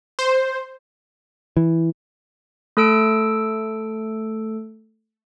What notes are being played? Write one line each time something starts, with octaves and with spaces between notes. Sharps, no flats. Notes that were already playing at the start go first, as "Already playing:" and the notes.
C5
E3
A3 A4 E6 D7